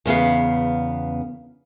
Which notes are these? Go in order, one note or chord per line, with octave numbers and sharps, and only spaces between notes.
E2 C#3 B3 F5